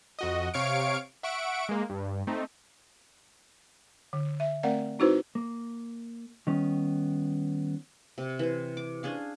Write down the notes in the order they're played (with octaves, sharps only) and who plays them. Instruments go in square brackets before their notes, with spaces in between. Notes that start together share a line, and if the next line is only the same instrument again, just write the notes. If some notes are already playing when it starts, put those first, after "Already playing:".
[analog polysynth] F2 F#4 D#5
C3 C#5 F5 C#6 D7
E5 F#5 C#6 D7
G#3 A#3
G2
A3 C4 D#4
[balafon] D3
E5
A3 C4 A#4 D5 F5 F#5
C4 D#4 E4 F#4 B4 C5
[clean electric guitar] A#3
D#3 G3 B3 C#4
[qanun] C3
E3 C5
D6
C#4 D4 G#4 F5